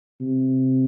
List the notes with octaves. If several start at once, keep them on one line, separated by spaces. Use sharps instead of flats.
C3